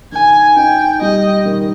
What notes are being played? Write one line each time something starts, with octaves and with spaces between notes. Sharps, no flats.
D#3 G#5
D#4 G5
G3 D#5
D#3